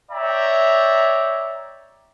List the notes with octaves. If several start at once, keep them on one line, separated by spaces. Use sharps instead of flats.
C#5 D5 E5 G5 A#5